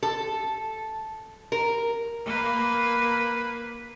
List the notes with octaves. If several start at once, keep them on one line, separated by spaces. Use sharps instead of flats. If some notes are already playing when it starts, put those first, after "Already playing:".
A4
A#4
A#3 B4